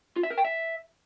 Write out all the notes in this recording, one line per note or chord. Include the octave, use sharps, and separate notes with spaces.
F4
E5
A#4
G5
E5